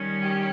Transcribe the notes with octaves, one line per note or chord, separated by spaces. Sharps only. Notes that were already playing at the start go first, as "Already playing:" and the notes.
Already playing: D#3 G3 C#4
G4